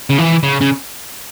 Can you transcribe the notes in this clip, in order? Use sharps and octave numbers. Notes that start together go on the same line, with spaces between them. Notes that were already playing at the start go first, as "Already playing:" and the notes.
C#3
E3
C#3
C#3